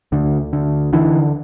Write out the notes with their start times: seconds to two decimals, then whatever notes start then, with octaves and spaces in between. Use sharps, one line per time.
0.12 D2 D3
0.53 D3
0.93 D3 E3